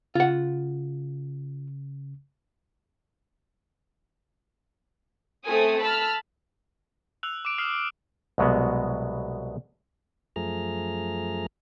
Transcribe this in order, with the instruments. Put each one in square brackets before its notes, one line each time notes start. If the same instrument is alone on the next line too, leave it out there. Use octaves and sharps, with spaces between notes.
[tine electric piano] C#3 [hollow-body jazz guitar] F4 F#5
[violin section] A3 C4 A4 G#5 D#6
A5 B5 E6 F6
[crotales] E6 F#6 F7
D6 D7
D#6 F6 C7 F7 F#7
[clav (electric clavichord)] C2 B2 F#3 G#3 B3
[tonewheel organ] F#2 F3 A3 G#4 A#5 F6